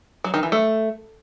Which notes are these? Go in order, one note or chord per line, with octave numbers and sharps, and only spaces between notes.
F#3
D#3
E3
A3